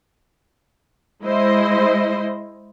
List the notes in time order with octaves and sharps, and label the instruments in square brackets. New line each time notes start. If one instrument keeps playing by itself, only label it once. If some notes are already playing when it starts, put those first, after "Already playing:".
[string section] G#3 E4 C5 D#5